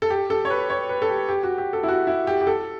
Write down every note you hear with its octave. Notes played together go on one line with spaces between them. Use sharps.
A4
G4
A4
C#5
B4
C#5
B4
A4
G4
G4
F#4
G4
A4
E4
F#4
E4
G4
G4
A4